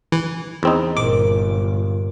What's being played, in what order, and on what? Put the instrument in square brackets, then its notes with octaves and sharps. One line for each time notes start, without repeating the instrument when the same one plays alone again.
[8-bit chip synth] E3
[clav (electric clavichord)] E2 C4 D#4
[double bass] G1 [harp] A#2 [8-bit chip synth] D6